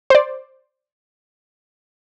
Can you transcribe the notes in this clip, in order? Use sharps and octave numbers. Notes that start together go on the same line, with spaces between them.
C5 D5